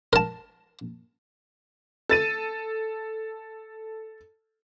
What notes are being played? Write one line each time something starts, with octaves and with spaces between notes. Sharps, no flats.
A#4 A5
A4 A6 D#7